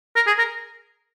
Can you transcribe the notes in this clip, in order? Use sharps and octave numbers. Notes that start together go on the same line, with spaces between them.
A#4
G#4
A#4